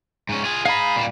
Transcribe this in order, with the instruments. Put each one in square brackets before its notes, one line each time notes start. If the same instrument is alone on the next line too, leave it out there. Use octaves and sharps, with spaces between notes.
[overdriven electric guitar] G#2 C#4
F4 G#4
[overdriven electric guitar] D#4 G#4 [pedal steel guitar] F5 B5
[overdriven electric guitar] A#2 G3